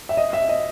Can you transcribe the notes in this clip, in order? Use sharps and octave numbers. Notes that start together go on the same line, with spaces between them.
E5
D#5
E5
D#5